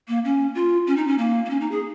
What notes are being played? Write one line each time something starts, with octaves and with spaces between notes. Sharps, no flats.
A#3
C#4
F4
C#4
D#4
C#4
A#3
A#3
C#4
D#4
G#4